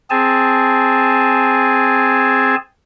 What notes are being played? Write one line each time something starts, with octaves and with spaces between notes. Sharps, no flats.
C4 G#4 G#5 A5